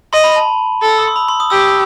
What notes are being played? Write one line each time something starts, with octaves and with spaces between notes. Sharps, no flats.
D#5 C6
B5
A5
A4
E6
D#6
C6
B5
C6
D#6
G4 E6
D#6
E6